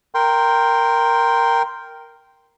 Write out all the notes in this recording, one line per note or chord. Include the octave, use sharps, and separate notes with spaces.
A#4 G5 C6